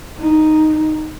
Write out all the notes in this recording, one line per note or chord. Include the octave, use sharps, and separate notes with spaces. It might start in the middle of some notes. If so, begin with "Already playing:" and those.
D#4